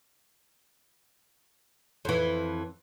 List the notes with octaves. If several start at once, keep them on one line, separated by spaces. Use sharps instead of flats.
F2 E3